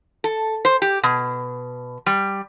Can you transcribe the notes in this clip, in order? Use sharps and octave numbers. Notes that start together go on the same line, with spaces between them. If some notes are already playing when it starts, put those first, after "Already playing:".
A4
C5
G4
B2
G3